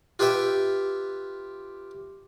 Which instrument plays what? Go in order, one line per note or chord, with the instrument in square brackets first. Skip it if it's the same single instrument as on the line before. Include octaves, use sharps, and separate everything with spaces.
[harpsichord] F4 G4 B4 E5 G5